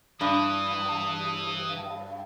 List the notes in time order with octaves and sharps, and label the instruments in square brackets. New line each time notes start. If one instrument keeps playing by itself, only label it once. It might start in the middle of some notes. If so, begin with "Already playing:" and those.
[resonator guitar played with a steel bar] G2 [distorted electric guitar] E3 [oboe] D#6